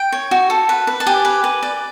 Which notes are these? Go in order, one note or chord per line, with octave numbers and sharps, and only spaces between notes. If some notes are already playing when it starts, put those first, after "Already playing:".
Already playing: G5
C#5
F#4
A4
B4
B4
A5
G4 G#5
B4
B4
D5